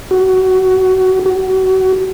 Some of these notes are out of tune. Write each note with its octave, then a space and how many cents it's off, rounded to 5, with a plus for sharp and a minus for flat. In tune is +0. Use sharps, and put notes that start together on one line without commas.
F#4 +20
F#4 +30